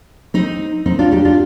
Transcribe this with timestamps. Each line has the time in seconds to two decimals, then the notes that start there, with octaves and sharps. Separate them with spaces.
0.34 C4 D#4
0.86 C4 D#4
0.99 D4 F4
1.11 D#4 G4
1.25 D4 F4